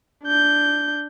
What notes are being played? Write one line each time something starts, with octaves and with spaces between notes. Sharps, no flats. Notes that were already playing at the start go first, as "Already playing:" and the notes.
D4 G6